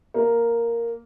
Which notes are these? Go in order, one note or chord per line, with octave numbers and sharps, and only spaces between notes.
A#3